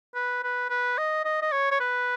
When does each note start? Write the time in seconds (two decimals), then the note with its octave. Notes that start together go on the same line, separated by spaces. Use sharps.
0.15 B4
0.44 B4
0.70 B4
0.98 D#5
1.25 D#5
1.42 D#5
1.52 C#5
1.71 C#5
1.80 B4